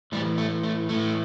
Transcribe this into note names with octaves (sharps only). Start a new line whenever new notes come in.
A2 E3 G3
A3
A3
A2 E3 A3